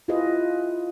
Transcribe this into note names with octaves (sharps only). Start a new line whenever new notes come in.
E4 F4 G4 G#4 B4 D#5